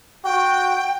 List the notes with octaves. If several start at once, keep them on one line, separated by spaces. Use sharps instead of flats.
F#4 G5